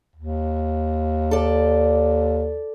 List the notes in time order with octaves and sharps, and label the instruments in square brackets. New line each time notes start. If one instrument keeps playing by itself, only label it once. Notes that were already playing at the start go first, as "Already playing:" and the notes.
[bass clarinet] D#2
[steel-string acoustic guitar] A4 D5